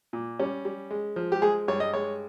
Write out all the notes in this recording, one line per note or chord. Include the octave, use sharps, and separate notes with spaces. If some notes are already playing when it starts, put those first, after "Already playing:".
A#2
G3 C#4
G3
G#3
F3
G4
G#3 G#4
G2 C#5
D#5
G#3 C#5